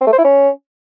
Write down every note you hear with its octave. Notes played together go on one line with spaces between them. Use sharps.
C4
A3
C5
E4
C#4